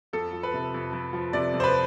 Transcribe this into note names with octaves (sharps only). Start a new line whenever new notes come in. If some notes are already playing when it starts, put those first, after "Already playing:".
F2 A4
F3
B4
C3
F2
F2
F3
C3 D5
F2
C5
B4